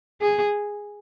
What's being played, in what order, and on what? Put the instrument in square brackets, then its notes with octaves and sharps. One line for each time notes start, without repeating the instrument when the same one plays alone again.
[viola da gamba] G#4